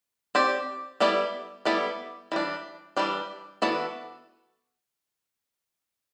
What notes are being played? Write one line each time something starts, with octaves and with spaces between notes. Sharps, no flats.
C4 G4 D5
G3 B3 E4 A4 D5
G3 B3 E4 A4 D5
E3 G3 D4
E3 G3 D4
E3 B3 D4 F#4 A4